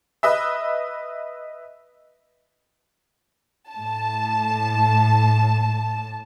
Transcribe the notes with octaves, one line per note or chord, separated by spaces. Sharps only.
B4 D#5 E5
A2 A5